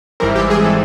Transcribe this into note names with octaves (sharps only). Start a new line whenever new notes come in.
G#1 G#2 E3 G3 C4 A#4
G4
G#4
A4